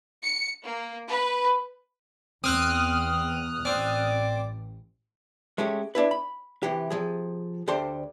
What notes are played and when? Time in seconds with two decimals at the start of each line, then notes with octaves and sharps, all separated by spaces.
0.23 C#7
0.63 A#3
1.08 B4
2.44 E2 C4 D#6 F6 F#6
3.65 A1 C4 D5
5.58 G#3 A3 C#4 G4
5.95 D4 E4 B4
6.11 B5
6.63 C3 E3 G4
6.90 C3 D#3 F3 G#4
7.67 D2 D4 G4 A4 C5 C6